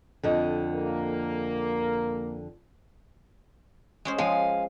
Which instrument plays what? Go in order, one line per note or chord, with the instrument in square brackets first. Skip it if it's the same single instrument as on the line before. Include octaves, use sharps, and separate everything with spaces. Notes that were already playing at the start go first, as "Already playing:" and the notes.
[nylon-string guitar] F2 D3 D#5
[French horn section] A#3
[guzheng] G#3 C#4 C5
[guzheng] F3 G#3 [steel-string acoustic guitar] F5 G#5